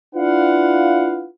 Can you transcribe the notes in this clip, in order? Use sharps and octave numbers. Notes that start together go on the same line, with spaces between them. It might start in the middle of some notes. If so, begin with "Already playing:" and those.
D4 E4 F4 B4 F5 F#5